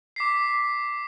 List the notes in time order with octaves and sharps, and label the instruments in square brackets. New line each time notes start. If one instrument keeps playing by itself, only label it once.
[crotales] D6 B6 C7